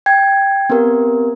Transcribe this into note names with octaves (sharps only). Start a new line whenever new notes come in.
G5 G#6
B3 C4 G4 A#4